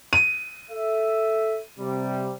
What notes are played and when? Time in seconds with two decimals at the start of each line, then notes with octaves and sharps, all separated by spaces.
0.13 D#7
0.71 A4 E5
1.79 C3 G3